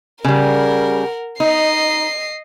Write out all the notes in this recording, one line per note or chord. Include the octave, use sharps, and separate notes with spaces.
C#3 G3 A#4 F#5
D#4 D#5 C7